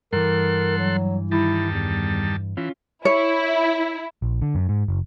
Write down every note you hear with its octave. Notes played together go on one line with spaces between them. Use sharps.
G2 E3 A4 A#4 F#5 C6
F#3
D#3 G3 E4 A5
E2
E3 C#4 F4
E4 C#5
A#1
D3
F#2
G#2
F#1